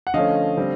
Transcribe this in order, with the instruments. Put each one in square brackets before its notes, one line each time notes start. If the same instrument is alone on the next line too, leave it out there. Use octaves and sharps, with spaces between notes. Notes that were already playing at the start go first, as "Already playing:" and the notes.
[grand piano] F#5
D3 F3 A3 C#4 D#5 F5
D3 G3 C4